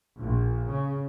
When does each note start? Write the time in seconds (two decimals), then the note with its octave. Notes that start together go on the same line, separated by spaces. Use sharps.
0.19 A#1
0.68 C#3